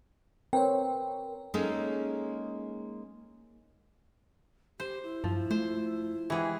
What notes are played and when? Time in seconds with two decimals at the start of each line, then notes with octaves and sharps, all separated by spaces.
0.53 C4 A#4 B4 C#5 G5
1.54 G#3 A#3 C#4 D#4 G#4 A4
4.80 G4 C5
5.03 E4
5.24 G2 F3
5.51 A3 C5
6.30 E3 G#3 G4 G#4 F#5